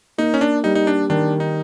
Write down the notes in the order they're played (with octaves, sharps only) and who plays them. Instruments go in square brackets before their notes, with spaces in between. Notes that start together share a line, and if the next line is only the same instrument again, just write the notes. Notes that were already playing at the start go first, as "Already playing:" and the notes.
[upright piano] A#3 [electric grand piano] D#4
[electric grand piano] C#4
D4
[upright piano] G3 [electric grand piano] D#4
[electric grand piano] D#4
D4
[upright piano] D#3 [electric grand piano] D4
[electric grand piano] D#4